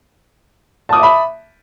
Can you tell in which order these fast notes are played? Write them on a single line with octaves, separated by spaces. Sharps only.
A5 D#6 D6 E5 B5